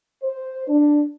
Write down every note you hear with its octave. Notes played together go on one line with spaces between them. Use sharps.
C5
D4